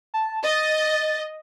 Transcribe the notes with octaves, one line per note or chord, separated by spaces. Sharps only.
A5
D#5 A6